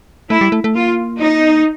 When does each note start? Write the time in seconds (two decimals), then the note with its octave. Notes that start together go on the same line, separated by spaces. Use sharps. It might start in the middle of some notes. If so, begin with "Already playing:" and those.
0.30 A3 E4
0.41 G3
0.52 A3
0.64 A3
0.75 A#3 F4
1.19 D#4
1.39 B3
1.51 A#3